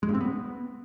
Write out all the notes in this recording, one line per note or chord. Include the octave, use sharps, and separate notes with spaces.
G#3
G2
C4
B3